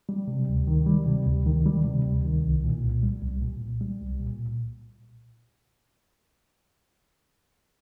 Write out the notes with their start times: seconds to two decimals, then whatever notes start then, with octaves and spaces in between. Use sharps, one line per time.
0.09 G3
0.28 C3
0.48 D2
0.67 D#3
0.86 G3
1.06 C3
1.26 D2
1.46 D#3
1.66 G3
1.85 C3
2.04 D2
2.24 D#3
2.44 C2
2.64 A#2
2.83 C2
3.03 G3
3.22 C2
3.42 A#2
3.62 C2
3.81 G3
4.01 C2
4.20 A#2